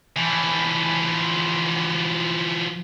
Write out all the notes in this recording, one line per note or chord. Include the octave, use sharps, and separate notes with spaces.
E3 F3